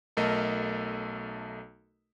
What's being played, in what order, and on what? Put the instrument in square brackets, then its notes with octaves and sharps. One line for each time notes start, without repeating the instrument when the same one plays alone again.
[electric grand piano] B1 A3 A4 A#4 D#5